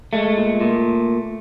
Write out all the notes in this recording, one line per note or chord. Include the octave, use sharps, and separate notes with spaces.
G#3 A3
A#2
A#2